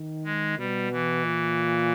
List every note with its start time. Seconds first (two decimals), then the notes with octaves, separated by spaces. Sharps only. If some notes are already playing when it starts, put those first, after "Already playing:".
Already playing: D#3
0.25 G#3
0.58 B2 G3
0.92 E3
1.25 A#2